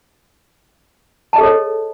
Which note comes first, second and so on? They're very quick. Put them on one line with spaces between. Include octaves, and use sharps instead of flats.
A5 D#5 G#4 A4 C#5